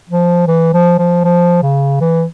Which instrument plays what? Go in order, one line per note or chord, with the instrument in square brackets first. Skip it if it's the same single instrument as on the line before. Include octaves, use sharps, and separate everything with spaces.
[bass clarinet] F3
E3
F3
F3
F3
C#3
E3